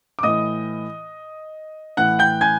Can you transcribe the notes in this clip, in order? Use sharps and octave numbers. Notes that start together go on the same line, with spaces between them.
D6
A2 E3 D#5 D#6
A2 E3 F#5 F#6
G5 G6
G#5 G#6